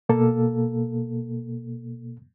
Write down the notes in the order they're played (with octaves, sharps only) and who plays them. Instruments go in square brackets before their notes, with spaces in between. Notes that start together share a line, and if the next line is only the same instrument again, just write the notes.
[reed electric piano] B2 A#3 A4